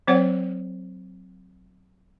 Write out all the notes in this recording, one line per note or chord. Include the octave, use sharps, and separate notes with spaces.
F#3 C4 C5 C#5 F#5 G5